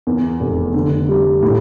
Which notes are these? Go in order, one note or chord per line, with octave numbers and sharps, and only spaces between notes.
E2
F1
D3
G3
A2